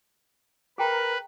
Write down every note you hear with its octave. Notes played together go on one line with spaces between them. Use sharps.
G#4 A#4 B4 G5 A#5